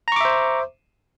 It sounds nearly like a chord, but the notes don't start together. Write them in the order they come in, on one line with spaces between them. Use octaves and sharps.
A#5 C#6 D6 E5 C5